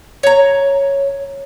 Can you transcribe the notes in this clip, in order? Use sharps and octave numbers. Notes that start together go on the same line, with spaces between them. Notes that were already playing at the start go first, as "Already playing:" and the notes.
C#5 A#5